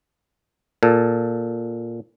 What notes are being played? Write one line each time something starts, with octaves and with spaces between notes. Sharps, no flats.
A#2 A4